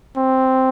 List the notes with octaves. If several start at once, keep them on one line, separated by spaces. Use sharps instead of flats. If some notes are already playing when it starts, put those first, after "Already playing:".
C4